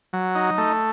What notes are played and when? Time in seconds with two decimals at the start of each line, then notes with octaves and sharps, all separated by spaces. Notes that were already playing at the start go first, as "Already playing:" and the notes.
0.13 F#3
0.35 D#4
0.58 A3